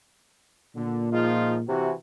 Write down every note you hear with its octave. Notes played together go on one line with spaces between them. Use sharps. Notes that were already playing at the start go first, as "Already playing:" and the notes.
A#2 D3
F3 G#3 D#4 F4
C3 E3 F#4